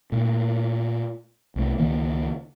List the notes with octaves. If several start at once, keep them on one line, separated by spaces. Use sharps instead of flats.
A#2 A3
C2 A3
C#2 D#3 A#3